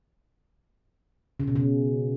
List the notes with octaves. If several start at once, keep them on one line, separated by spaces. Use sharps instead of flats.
C#3
B2
C#3